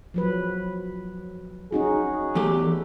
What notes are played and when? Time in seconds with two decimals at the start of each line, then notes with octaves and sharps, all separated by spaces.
0.14 F3 F#3 B4
1.72 C#4 D#4 F#4 G#4
2.35 E2 A3 G4